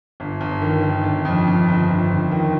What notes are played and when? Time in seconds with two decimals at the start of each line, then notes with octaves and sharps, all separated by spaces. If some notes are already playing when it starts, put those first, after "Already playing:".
0.20 G1
0.41 G1
0.62 D#3
0.83 D#3
1.04 G1
1.25 F2
1.47 F2
1.68 G1
1.89 G1
2.10 G1
2.32 D#3